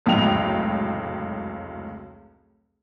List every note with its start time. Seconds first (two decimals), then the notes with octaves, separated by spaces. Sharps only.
0.06 F1 C#2 F#2 A2 G5 F7